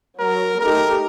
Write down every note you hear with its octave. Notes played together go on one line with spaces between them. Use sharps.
F#3 A#4
A3 D#4 G4 A#4